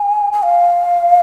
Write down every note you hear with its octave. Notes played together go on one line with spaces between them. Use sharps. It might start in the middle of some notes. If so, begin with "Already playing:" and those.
Already playing: G#5
G#5
F5